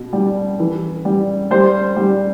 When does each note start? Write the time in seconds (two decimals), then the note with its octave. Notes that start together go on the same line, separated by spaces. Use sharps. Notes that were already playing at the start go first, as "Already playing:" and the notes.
Already playing: B2
0.13 G3
0.60 E3
1.05 G3
1.51 G3 C5
1.96 G3